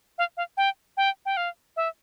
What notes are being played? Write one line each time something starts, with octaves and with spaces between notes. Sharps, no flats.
F5
F5
G5
G5
G5
F5
E5